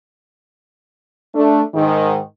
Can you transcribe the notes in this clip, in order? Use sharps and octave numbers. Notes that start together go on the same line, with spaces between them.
A3 D4
G#2 D#3